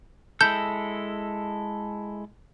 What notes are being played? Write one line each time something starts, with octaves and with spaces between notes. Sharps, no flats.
G#3 E4 A4 G6